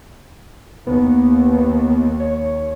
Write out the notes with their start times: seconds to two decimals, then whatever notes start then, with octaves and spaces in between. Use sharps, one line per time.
0.87 D#2 B3
2.20 C#5